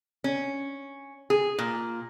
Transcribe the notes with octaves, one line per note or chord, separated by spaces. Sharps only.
C#4
G#4
A#2